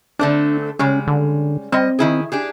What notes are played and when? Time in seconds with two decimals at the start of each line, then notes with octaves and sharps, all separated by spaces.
0.19 D3 A3 C4 D4
0.79 C#3 G3 G#3 C#4
1.07 D3
1.72 G3 C4 D#5
1.99 D#3 E4 G#4
2.32 D4 G4 G#4